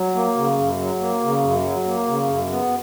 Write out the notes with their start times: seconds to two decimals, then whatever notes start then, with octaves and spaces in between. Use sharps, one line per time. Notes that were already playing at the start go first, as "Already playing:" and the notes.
Already playing: F#3
0.15 A#3
0.37 C#3
0.58 F#2
0.79 F#3
1.00 A#3
1.22 C#3
1.43 F#2
1.63 F#3
1.86 A#3
2.07 C#3
2.28 F#2
2.49 B3